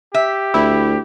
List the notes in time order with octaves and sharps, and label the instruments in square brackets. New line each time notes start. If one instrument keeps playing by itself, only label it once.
[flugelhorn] G4 [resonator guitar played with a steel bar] E5
[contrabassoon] D2 [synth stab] E4